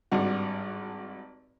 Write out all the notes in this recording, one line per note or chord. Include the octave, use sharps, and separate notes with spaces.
G#1 G2 F#4